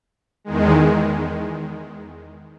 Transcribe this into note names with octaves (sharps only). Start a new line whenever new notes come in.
E2 D#3 G#3